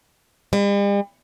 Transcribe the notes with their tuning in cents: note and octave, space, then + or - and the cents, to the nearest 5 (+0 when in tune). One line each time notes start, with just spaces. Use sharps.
G3 +45